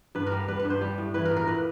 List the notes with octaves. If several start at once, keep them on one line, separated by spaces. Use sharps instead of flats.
G2 B4
A#4
G3
G3 B4
B4
G2
C5
G3
A2
E3 B4
A#4
A2
A#4
A#2 B4